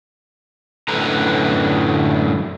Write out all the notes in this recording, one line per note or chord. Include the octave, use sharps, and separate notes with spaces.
F#2 A2 D3 B4 A#5